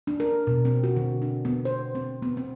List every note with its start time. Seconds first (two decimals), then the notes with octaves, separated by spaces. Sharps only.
0.07 D4
0.20 A#4
0.47 B2
0.65 C4
0.84 F#4
0.97 D3
1.22 D4
1.45 B3
1.65 C5
1.95 C4
2.22 B3
2.37 C4